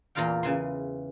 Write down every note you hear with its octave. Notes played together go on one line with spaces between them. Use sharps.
E2 A#2 F4 A#4 F5 G5
C#3 E3 C6